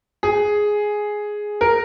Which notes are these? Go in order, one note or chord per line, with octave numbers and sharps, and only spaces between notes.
G#4
A#4